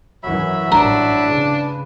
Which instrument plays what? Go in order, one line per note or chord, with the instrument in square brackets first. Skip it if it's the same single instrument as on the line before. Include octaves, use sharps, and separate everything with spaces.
[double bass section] F#2 E3 [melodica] F#3 E5 B5
[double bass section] A1 G2 [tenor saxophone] D4 [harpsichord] A#4
[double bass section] C#3 [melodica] B4